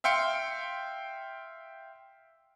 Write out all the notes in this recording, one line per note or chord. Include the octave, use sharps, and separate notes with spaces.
E5 F5 G5 C6 C#7